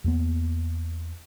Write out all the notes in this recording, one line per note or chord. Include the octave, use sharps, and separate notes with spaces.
E2 A#3 B3